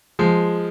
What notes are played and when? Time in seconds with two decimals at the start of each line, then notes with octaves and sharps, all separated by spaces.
0.19 F3 G#3